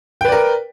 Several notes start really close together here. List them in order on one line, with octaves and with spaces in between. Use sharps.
G5 B4 D5 A#4